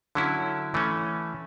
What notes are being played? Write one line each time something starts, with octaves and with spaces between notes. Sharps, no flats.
D3 F#3 C#4 E4
E3 A3 C#4